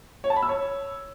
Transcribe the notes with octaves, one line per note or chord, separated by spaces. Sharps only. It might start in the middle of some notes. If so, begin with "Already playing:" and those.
C#5
A5
B5
E6
C#5